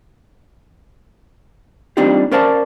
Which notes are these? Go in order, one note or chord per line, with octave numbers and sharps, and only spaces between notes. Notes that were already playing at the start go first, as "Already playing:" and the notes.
G3 C4 D4 D#4 F4 G4
C#4 A#4 C5 D5 F5 A5